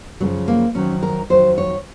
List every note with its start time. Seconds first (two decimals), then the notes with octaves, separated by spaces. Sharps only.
0.20 F#2 C#3 F3 F#3
0.48 A#3
0.75 F2 D#3 F#3 C#4
1.03 A#4
1.30 F2 D#3 F#3 C5
1.58 C#5